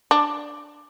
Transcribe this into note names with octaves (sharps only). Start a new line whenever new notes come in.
D4